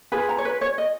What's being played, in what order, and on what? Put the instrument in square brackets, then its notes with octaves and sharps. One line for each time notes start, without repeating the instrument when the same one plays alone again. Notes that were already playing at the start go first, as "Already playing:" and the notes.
[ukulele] F4 G#4 B4 B5
A#5
C#5
B4
C#5
D#5